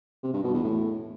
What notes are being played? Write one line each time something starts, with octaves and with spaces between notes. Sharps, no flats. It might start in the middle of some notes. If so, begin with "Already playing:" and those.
C3
G2
B2
E2
A2